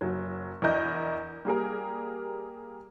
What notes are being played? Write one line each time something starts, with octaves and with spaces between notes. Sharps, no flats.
F#1 F#3
E2 D4 E4 A#4 D#5 G6
G3 A#3 G#4 A#4